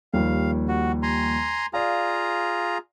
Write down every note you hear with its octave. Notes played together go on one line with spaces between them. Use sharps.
D#2 F3 G3 F5
F#4
G#5 A#5 C6
F4 G#4 D5 F5 A#5